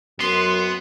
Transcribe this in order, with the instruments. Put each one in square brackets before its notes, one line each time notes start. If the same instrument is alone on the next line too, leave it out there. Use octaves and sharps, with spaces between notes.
[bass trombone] F#2 [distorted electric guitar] B3 [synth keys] C6